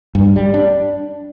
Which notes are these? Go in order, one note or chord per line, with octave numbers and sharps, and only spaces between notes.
G2
G3
D4